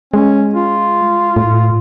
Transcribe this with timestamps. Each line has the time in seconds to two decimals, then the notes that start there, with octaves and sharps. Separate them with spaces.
0.14 G#3 C#4
0.54 F4
1.36 A2